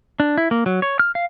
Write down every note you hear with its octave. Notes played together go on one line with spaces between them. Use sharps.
D4
E4
A#3
F#3
C#5
F6
F5